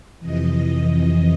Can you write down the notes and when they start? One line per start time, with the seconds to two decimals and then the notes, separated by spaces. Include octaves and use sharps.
0.20 F2 C3 E3 D#5